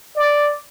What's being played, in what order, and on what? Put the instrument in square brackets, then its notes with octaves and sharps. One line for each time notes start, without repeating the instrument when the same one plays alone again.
[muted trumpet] D5